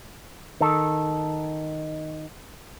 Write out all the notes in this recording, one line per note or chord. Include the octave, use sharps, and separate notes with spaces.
D#3 A4